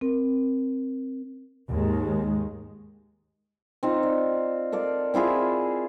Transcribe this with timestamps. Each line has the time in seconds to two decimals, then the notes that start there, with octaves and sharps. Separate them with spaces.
0.01 C4 A#4
1.69 D#2 G#2 D#3 G#3
3.83 C4 D#4 F4
4.03 D5
4.72 A4 A#4 D5 F5
5.14 C4 E4 F4 G#4